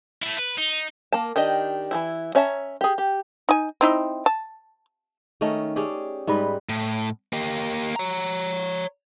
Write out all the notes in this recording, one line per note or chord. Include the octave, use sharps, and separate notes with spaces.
A3 E4
B4
D#4
A#3 A5
D#3 D4 G4 D#5
E3 F3 E4
C#4 C#5 E5 A5 A#5
G4 G#4
G4
D#4 G#5
C4 D#4 E4
A5
D#3 A3 C#4 D#5
C#4 G4 G#4 D5
G#2 G3 B4 D#5
A2
A#3 G4
C#5 A#5